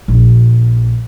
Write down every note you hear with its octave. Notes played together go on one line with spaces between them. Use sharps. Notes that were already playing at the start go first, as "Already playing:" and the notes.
A#1